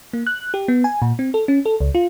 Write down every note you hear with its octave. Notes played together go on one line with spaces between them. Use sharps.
A#3
F#6
G4
B3
G#5
A#2
C4
A4
C#4
A4
C#2
F4